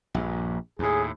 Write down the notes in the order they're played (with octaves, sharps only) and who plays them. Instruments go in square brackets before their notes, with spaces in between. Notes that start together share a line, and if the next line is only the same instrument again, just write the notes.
[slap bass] A#1 G2
[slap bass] D#2 A2 [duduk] G#4